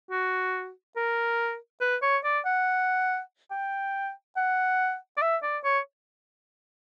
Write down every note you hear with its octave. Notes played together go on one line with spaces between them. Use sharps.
F#4
A#4
B4
C#5
D5
F#5
G5
F#5
D5
E5
D5
C#5